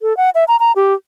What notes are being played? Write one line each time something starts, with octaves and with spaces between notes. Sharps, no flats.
A4
F#5
E5
A#5
A#5
G4